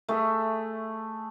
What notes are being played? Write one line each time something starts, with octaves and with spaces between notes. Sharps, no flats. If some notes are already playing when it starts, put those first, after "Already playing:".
A3 G#4 E5